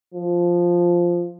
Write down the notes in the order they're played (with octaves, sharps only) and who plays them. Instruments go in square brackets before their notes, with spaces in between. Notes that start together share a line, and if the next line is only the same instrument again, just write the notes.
[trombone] F3